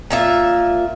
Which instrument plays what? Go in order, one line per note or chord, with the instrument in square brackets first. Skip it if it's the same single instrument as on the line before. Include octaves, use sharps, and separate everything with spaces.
[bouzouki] A#2 F4 E5